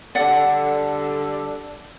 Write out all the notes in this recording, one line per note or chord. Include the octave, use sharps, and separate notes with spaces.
D3 G3 D4 A4 D5 F#5